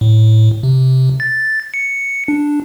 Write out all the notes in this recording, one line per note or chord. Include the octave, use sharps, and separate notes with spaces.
A2
C3
A6
C#7
D4